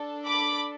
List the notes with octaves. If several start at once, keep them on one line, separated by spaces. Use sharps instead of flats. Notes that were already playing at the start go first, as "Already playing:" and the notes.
Already playing: D4 A4
B5 D6